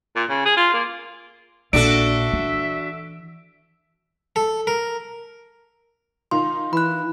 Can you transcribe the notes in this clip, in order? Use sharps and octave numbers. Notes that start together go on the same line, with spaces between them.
A#2
C#3
G#4
F4
A#3
A#1 D4 F#4 A4 E5 D7
E3
A4
A#4
D#3 D#4 F4 C6
E3 B5 F#6